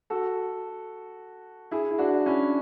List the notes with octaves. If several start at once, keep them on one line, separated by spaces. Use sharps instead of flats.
F#4 A4
E4 G#4
E4
D4 F#4
C#4 E4